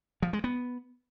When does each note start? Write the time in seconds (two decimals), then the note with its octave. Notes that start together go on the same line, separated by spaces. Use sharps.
0.22 F3
0.33 G#3
0.44 B3